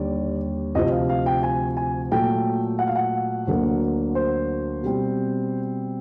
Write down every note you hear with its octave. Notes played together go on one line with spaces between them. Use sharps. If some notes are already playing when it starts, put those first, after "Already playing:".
Already playing: D#2 D3 G3 D5
D2 C3 F3 D#5
F5
F5
G5
G#5
G#5
A#2 F#3 A3 G5
F#5
F5
F#5
D2 D3 F#3 A#3
C5
B2 G3 C4